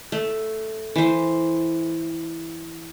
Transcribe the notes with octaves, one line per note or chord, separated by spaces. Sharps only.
A3
E3 C5